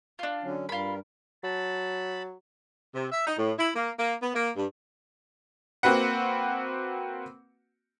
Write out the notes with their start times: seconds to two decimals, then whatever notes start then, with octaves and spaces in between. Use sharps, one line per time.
0.19 D4 F4
0.43 D3 F#3 C#4
0.69 G2 G3 F4 A#4 B5
1.43 F#3 A5 B5
2.95 C3
3.12 E5
3.27 D#4
3.38 A2
3.59 E4
3.76 A#3
3.99 A#3
4.23 B3
4.35 A#3
4.56 G2
5.83 A#3 C4 F#4 B4 F#5